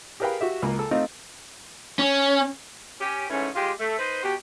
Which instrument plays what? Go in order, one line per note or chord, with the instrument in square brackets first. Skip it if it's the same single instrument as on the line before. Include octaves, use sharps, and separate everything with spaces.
[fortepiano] G4 G#4 A#4 B4 F5 G5
F#4 G4 E5
C#2 A#3
A4
A3 C4 D#4 F4
[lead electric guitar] C#4
[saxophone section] C#4 G4
G#2 E3 A3 C#4
G#3 F4 G4
A3
D#4 B4 C5
B2 F#4 G4